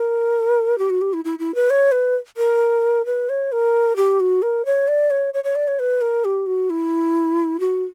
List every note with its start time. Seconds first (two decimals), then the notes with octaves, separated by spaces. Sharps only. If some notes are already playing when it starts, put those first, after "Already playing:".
Already playing: A#4
0.78 G4
0.90 F#4
1.01 G4
1.13 E4
1.25 E4
1.39 E4
1.55 B4
1.70 C#5
1.92 B4
2.37 A#4
3.06 B4
3.29 C#5
3.52 A#4
3.96 G4
4.20 F#4
4.42 A#4
4.65 C#5
4.88 D5
5.10 C#5
5.34 C#5
5.44 C#5
5.55 D5
5.68 C#5
5.79 B4
6.01 A#4
6.25 G4
6.46 F#4
6.70 E4
7.60 F#4